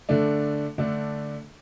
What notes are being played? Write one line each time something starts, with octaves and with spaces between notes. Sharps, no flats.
D3 A3 D4
D3 A3 D4